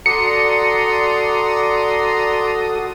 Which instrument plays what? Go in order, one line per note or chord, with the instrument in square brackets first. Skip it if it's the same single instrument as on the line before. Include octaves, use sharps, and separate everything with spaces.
[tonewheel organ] F#4 A4 D#6 [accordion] D5 A#5 C6 [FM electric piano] C#7